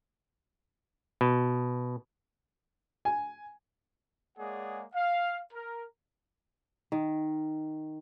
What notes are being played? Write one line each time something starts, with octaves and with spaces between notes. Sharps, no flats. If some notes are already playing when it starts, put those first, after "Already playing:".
B2
G#5
G#3 A#3 G#4 C#5 D5 F#5
F5
A#4
D#3